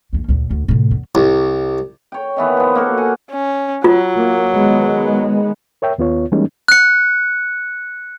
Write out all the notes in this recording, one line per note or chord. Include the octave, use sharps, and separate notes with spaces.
D#2 A#3
D2 A#2
D2
A2 C3
E2
C2
C#5 G5
D#3 E3 B3
F3 B3
A#3 F#4 A4
F#5 G#5
C#4
F#3 F4
A#3
D#3 G#3 B3
A#4 C#5 E5 G5
D#2 B3 F4 C#5
E3 G3 G#3 A#3 C#4 D#4
F#6 C#7